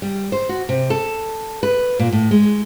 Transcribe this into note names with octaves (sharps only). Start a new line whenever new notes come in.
G3
C5
F#4
C3
A4
B4
A#2
A2
G#3